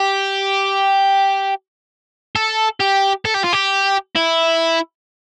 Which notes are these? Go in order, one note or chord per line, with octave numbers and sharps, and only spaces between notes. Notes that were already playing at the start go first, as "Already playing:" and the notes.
Already playing: G4
A4
G4
A4
G4
F4
G4
E4